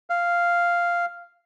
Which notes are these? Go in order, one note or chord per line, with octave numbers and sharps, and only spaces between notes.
F5